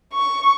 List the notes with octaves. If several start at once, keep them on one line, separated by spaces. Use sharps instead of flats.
C#6